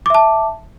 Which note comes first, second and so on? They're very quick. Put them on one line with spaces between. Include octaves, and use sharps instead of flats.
D6 E5 A5